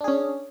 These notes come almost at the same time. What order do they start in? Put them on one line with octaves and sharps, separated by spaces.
D4 G#4 C#4